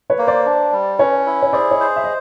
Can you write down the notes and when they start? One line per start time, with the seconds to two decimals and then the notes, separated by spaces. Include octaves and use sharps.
0.10 B4 C#5
0.18 A#3
0.28 C5 D5
0.46 D4
0.72 G3
0.99 C#4 B4 C#5
1.26 E4
1.43 C#5
1.53 G#4 C5 D5
1.71 C#5 D#5
1.80 C5
1.96 E5
2.04 D#5